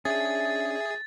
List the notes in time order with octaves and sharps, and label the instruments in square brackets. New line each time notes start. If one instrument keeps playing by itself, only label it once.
[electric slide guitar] C#4 D4 [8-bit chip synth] G#4 [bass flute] E5 [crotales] A6